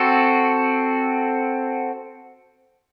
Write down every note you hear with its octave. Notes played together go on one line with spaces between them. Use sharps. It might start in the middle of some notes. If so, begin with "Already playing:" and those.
Already playing: C4 F#4 A4